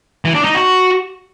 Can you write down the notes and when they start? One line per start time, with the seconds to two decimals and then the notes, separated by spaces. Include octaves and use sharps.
0.25 E3
0.35 D4
0.45 D#4
0.55 F#4